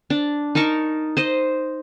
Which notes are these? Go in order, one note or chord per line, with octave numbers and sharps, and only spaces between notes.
D4
D#4 A#4 A5 C#6
C5 D#5